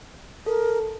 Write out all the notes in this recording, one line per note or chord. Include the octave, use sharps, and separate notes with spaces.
A4 A#4